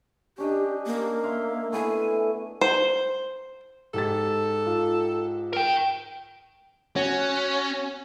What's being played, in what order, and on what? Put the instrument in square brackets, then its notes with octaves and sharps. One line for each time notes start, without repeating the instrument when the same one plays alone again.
[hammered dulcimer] C#4 D4 D#5 [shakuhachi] G4
[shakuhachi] A#3
[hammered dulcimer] E5 F5 C6
[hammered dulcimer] A3 B3 E4 [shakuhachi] G#5
[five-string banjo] C5
[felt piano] G#2 G4 A6 [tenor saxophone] A4
[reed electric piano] F4
[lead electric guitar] A#4 G5
[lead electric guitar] C#4 [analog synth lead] F#4 [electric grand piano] C#5